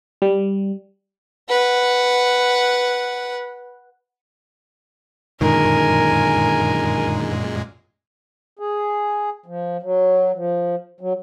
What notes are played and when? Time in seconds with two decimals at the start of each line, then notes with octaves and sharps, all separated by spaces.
0.22 G3
1.49 B4 F#5
5.41 F#2 A#2 D3 D#3 G#3 A#4 G#5
8.59 G#4
9.46 F3
9.83 F#3
10.35 F3
11.01 F#3